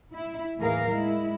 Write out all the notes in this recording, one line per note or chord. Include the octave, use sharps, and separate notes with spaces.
E4
D#2 A2 E3 G#4 A#4 F5
G#3 E4